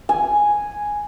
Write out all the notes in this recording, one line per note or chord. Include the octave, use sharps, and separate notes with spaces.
G#5